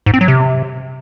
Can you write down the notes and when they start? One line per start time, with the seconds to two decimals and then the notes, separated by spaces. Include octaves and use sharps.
0.06 G#2
0.14 C4
0.21 F#3
0.28 C3